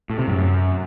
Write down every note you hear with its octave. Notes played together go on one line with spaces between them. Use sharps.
A2
C3
F#2